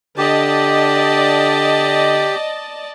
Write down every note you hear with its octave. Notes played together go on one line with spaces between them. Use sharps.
D3 G4 D5 D#5 A5